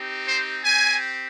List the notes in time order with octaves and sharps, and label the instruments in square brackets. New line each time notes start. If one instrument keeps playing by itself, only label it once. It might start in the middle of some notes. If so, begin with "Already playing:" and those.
Already playing: [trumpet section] C4 D#4 G4
C5
C4 G4 G#5